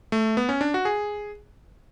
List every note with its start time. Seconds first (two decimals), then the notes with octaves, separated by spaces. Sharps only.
0.12 A3
0.37 B3
0.49 C#4
0.61 D4
0.74 F#4
0.85 G#4